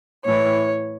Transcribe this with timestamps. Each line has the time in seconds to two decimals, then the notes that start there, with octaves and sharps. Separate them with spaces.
0.26 A2 E3 C#5